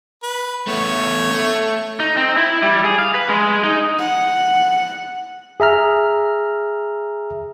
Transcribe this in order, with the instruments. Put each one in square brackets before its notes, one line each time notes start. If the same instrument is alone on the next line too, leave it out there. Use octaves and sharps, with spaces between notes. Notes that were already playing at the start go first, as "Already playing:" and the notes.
[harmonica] B4
[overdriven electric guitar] A3 B3 [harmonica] C#5
[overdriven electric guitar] A3
[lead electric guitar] D#4
C4
E4
G3
G#4
F5
B4
G#3
D#4
[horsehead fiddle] F#5
[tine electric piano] G#4 E5 A#5 F6